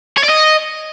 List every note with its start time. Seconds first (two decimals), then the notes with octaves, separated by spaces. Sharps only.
0.18 C#5
0.24 D5
0.29 D#5